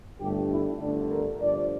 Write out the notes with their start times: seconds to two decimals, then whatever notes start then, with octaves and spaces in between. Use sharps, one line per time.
0.20 G1 G2 D3 A3 G4
0.50 E4
0.80 G1 G2 D3 A3 D4
1.11 A#4
1.40 G1 G2 F3 D5